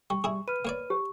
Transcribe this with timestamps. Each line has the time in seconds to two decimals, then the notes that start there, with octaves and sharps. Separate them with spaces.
0.10 G3 C#6
0.24 G3 E4 G#4
0.48 B4 F6 D#7
0.65 A#3 C#5 D5
0.90 G4